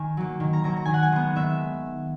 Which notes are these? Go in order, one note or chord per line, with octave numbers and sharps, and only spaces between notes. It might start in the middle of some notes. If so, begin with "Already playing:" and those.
Already playing: D#3 G#5
F#3 A#3
D#3
A#5
F#3 A#3 A#5
A#5
D#3 G#5
F#5
G#5
G#3 B3
D#3 E5